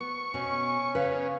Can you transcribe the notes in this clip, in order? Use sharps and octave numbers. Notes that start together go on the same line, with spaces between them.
B3 C#6
B2 C#4
C#3 B4 F5